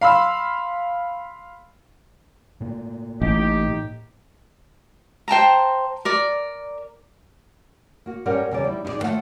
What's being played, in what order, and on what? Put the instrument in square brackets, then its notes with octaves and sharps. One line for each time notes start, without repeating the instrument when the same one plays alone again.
[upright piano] F5 B5 C6 E6
[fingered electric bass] A2 A#3
[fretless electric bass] A1 [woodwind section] D#4 G4
[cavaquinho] C5 G5 A5 A#5
A#4 D5
[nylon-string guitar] A#3 F#4
G2 G3 C#4 A#4 F#5
E2 C#3 G3 G#4 D5
G3 D#4 E4
D#4 E4 F#4 G#4 D5
D#2 A2 F3 A3 F#5